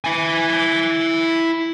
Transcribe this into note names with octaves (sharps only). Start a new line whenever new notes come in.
E4 G#5